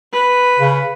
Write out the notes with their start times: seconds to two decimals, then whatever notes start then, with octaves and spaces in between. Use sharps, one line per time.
0.12 B4
0.59 C#3